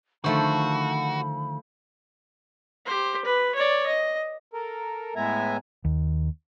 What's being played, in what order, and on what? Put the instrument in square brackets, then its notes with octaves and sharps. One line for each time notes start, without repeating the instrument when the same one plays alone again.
[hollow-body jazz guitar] D3 D#3 [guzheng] F3 A3 C5 [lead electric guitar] F#4 [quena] B5
[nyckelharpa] G4 C5
B4
C#5 D5
D#5
[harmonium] A4 A#4
A2 G#3 B3 E5 G#5 A#5
[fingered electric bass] D#2